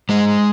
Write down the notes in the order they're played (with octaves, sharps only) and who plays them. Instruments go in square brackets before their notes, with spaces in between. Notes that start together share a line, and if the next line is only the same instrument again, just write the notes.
[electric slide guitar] G#2 G#3